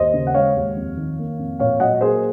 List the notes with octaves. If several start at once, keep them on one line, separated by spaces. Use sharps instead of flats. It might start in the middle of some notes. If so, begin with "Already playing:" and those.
Already playing: D#2 C5 D#5
C#3
F#5
G#3 C#5 F5
D#2
F2
D#3
A#3
F2
A#2 C#5 F5
F#3 D#5 F#5
A#3 G#4 C5